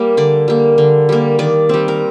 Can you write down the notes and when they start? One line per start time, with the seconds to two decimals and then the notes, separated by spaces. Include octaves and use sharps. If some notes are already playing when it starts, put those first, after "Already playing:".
Already playing: G3 A#3
0.17 D3 D5
0.48 G3 A#3
0.78 D3
1.09 G3 A#3
1.39 D#3 D5
1.69 G3 C4
1.88 A#4